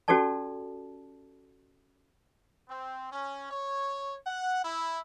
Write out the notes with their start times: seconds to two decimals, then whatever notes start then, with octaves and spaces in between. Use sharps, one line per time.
0.08 C#4 F#4 G4 A4 D5 A5
2.68 C4
3.11 C#4
3.50 C#5
4.26 F#5
4.63 E4